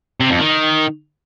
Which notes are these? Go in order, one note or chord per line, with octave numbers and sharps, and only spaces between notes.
C3
F2
D#3